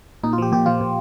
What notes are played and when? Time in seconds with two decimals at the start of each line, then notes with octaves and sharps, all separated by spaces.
0.24 A#2 D#4
0.33 F4
0.38 F3 G4
0.52 A#2 G4
0.66 F3 F4
0.81 A#2